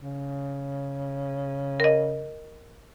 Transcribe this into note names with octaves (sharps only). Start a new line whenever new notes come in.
C#3
A#4 D#5